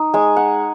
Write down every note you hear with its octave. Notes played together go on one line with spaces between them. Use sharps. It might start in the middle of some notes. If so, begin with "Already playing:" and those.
Already playing: D#4
G#3 G#5
F#5